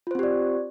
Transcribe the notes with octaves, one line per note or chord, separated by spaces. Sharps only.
C4 F4 G4 C5 D5